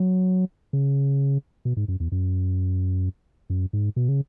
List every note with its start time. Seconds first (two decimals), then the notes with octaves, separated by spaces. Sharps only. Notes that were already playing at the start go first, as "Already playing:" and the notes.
Already playing: F#3
0.73 C#3
1.65 B2
1.77 G#2
1.88 F#2
2.00 E2
2.12 F#2
3.50 F#2
3.73 G#2
3.96 B2
4.08 C#3